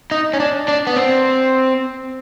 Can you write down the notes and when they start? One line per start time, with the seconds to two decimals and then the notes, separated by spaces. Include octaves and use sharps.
0.11 D#4
0.33 C#4
0.40 D4
0.68 D4
0.87 B3
0.96 C4